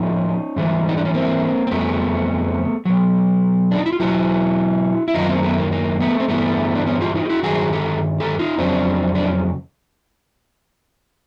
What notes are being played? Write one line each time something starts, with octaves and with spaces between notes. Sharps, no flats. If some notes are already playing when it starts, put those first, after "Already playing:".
Already playing: A2 F3 C#4 D#4
G#2 E3 G3
D#4
D4
C#4
A#3 C4
C4
F2 C#3 G3 A3 B3
B2 F#3
D4
D#4
E4
F4
B2 F#3 E4 F#4
E4
F#2 D#3 F#3 D#4 F4
A#3 C4
A3 B3
A#3
A#3
A3 B3
C4
G2 E3 G3 A3 B3
D4
B3 C#4
F4 G4
D#4 F4
G4
E4 F#4
G2 D#3 F#3 F#4 G#4
G4 A4
G4 A4
D#4 F4
F2 C#3 F#3 C4 D4
D4
C#4